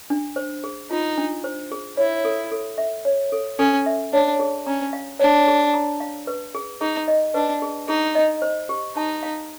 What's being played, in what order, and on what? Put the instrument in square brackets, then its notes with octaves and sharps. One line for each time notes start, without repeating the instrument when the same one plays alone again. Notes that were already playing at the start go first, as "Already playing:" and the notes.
[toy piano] D4
C5
G#4
[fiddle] D#4 [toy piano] F4
[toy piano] D4
C5
G#4
[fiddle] E4 [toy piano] C#5
[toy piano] A4
A4
E5
C#5
A4
[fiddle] C#4 [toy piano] A4
[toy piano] E5
[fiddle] D4 [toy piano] C#5
[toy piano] G#4
[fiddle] C#4 [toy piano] A#5
[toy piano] F5
[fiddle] D4 [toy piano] C#5
[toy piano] G#4
A#5
F5
B4
G#4
[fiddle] D#4 [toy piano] G#4
[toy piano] D#5
[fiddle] D4 [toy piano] B4
[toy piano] G#4
[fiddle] D#4 [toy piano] G#4
[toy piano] D#5
C5
G4
[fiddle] D#4 [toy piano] A5
[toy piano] F5